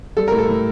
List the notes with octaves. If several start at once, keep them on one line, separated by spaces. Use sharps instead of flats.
G3 A4
A2 A#4
A4
A2